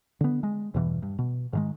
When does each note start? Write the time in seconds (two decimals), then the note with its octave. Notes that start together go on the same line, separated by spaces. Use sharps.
0.21 D3 B3
0.43 G#3
0.74 E2 G2 B2 E3
1.03 G2
1.19 B2
1.53 G#2 D#3 G#3